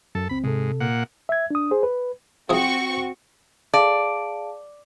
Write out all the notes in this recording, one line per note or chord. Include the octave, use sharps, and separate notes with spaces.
F#2 A4
C#2 C4 B5
G#2 C3 A4
A#2 F#5
E5 G#6
D4 D#6
G#4 C5
B4
F3 C4 E4 F#4 G#4 C#6
G#4 D5 F5 A5